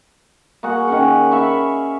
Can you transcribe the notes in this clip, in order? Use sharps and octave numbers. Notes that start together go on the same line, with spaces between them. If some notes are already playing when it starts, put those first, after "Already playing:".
A#3 F#4 G#4 F#5
D#3 C#4 F#5
E5 F5 B5 C#6